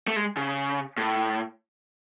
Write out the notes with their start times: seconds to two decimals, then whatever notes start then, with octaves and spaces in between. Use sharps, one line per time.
0.07 A3
0.16 G#3
0.37 C#3
0.98 A2